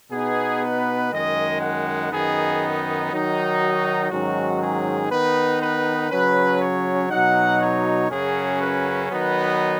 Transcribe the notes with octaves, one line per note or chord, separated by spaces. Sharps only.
B2 B3 D#4 G#4
B4
F#2 D#3 G#3 D#5
F#5
F#2 D#3 B3 D#4 G#4
D#3 F#3 D#4
F#4
G#2 D#3 F#3 C#4 F#4
G#4
D#3 B3 D#4 B4
B4
C#3 F#3 C#4 B4
C#5
B2 F#3 D#4 F#5
C#5
F#2 C#3 F#3 C#4 G#4
B4
D#3 F#3 B3 D#4 B4